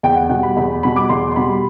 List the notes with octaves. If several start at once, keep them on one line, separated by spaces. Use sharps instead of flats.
E2 G5
F#5
B2 G3 F#5
B5
E2 B5
B2 G3 B5
D6
E2 C6
C6
B2 G3 B5